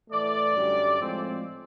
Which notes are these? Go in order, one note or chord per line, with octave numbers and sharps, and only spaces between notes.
A2 E3 A3 D5
F#2 D3 G3
A2 F3 G#3 C4